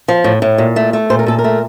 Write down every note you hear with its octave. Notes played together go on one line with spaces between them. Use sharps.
F3
A2
A2
A#2
A3
A3
A#2 C5
A#4
A#2 A4
A#4
A3